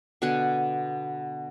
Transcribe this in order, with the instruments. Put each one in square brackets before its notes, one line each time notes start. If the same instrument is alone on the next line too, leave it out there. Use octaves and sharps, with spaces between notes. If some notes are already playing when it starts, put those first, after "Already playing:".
[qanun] B2 D3 F#5 G#5